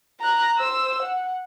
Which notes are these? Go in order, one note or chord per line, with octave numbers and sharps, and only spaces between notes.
A#5 F#6
C5 E6
F#5